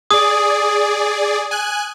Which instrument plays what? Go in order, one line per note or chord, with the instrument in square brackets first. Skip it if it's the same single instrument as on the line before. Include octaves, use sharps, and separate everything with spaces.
[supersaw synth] G#4 D5 [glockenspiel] D#6
[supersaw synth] G#5 F#6